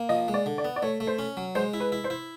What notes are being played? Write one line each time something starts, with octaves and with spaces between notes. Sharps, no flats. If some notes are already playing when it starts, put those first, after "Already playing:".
Already playing: A#3
F3 D#5
G#3
D5
D3
D5
B3
D5
A3 C#5
A3
C5
C#4
F#3
G#3 C5
E4
B4
E4
C5
E4